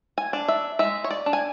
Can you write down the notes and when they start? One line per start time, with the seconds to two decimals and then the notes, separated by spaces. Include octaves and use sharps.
0.18 G#5
0.33 D4
0.48 E5
0.79 G#3 E5
1.04 C#5
1.10 D5
1.26 D4
1.33 G#5